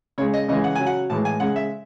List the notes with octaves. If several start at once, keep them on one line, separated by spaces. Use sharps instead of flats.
C#3 G#3 C#5
D#5
C#3 E3 G#3 D#5
F#5
C#3 F#3 G#5
F#5
A2 E3 G#3 A5
G#5
C#3 G#3 F#5
E5